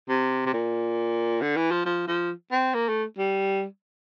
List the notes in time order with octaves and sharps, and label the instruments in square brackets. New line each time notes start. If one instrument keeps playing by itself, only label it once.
[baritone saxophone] C3
C3
A#2
D3
E3
F3
F3
F3
C4
A#3
A3
G3